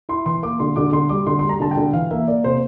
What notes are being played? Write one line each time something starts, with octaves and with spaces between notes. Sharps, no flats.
E4 C6
E3 C6
A#3 D6
D3 C6
D3 D6
D3 C6
G3 D6
D3 C6
G3 C6
A#5
D3 A5
G5
D3
E3 F5
A#3 E5
A#3 D5
C3 C5